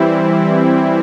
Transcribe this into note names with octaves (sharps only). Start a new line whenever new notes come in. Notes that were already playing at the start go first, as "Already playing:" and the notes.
Already playing: E3 G3 C4 E4